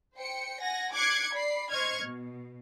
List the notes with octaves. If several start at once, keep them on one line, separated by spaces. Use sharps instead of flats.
C5 G5 C#7
F#5 G#5 A#6
D6 F#6 G#6 C7 C#7
D5 B5 C7
C5 D#5 C#6 F6 G#6
B2